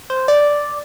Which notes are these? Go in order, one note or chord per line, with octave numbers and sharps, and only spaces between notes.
C5
D5